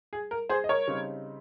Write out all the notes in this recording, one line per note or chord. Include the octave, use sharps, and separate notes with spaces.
G#4
A#4
G#4 C5
D#5
A#4 C#5
C#3 G3 C4 D#4